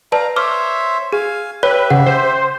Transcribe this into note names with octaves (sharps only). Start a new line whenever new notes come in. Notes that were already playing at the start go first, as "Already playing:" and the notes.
B4 D5 F5 A5 A#5
C5 C#5 E5 D6 F6
G#4 F5 G#5
G4 B4 C#5 E5
C#3 F#5
C5